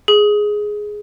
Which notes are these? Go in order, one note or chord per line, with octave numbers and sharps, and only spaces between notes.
G#4